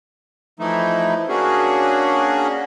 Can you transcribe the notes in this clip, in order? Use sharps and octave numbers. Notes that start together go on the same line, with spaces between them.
E3 F3 A3 D#4 E4
A#3 C#4 D4 F#4 G#4